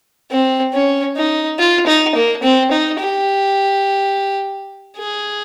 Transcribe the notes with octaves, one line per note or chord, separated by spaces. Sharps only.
C4
C#4
D#4
F4
D#4
A#3
C4
D#4
G4
G#4